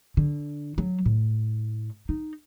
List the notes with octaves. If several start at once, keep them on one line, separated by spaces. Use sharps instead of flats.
D3
F#3
A2
D#4